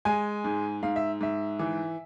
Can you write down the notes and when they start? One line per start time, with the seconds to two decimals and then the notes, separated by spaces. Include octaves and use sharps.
0.05 G#3 G#5
0.44 G#2
0.83 G#2 F5
0.96 E5
1.21 G#2 E5
1.59 E3